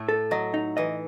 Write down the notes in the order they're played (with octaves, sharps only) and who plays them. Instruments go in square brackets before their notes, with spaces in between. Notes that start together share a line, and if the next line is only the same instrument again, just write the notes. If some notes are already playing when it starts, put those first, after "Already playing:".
Already playing: [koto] A2 A3
[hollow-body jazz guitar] A4
[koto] F#3 [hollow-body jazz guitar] D#5
[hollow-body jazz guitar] D#4
[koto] E3 [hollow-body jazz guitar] D#5